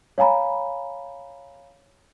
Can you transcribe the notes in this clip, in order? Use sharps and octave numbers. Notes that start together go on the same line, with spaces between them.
C#5 F5 G#5 A#5 B5